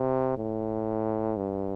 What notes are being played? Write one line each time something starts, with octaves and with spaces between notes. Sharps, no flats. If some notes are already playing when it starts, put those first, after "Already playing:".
Already playing: C3
A2
G2